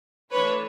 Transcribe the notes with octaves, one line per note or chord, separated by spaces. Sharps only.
E3 A3 D4 B4 C#5